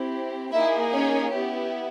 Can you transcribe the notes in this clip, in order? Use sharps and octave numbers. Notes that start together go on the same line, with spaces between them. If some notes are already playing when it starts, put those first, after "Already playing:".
Already playing: C4 E4 G4
A#3 D#4 E4 G#4 E5
C#4 C#5
B3 E4 G4